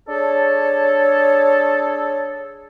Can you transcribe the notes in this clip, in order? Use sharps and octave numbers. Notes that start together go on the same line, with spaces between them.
D4 G#4 A4 C#5